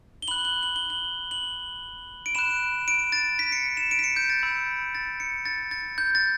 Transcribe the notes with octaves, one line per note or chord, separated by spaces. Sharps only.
G7
B5 F#6 F#7
F#7
F#7
G7
F#7
F#7
D7
B5 F#6 E7
D7
A6
B6
C#7
E7
D7
B6
C#7
G6
A6
B5 E6 G6
A6
C#7
A6
A6
G6
A6